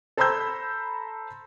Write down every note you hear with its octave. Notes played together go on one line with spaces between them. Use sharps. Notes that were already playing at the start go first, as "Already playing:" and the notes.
A4 C5 A#5 B5 E6 G6